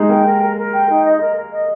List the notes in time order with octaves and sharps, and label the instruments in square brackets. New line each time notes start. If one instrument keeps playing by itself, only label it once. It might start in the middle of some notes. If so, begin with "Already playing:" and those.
Already playing: [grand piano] G#3 [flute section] D#4
[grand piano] A#3 [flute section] G5
[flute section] A#4
A#4
A#4
G5
D#4
D#5
A#4
A#4
D#5